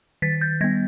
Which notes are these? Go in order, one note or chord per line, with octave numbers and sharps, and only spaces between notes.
D#3 A6 B6
G6 A6
G3 B3 G#6 A#6